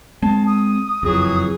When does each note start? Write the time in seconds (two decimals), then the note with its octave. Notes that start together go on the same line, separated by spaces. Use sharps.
0.22 G#3 C4 A5
0.47 D#6
1.03 F#1 F2 E3 F#3 G#4